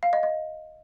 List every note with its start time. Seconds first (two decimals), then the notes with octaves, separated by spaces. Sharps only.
0.03 F5
0.13 D#5
0.23 D#5